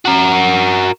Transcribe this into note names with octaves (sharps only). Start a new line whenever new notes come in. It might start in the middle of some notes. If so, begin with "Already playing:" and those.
F#4 A#4